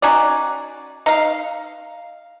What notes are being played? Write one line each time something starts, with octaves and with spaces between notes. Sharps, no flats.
C#4 D#4 F#4 D5
D#4 F5